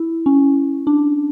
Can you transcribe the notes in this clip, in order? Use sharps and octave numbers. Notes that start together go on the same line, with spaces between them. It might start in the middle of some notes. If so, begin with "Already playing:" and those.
Already playing: E4
C#4
D4